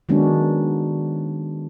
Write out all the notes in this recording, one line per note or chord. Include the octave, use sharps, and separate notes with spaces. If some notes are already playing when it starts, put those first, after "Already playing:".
D#3 F#3 G#3 B3 C#4 D4